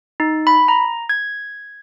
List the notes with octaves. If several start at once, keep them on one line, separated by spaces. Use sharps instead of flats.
D#4
B5
A#5
G#6